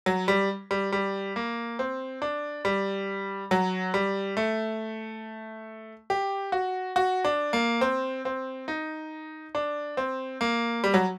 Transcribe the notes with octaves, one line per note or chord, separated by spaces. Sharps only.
F#3
G3
G3
G3
A#3
C4
D4
G3
F#3
G3
A3
G4
F#4
F#4
D4
A#3
C4
C4
D#4
D4
C4
A#3
G3
F#3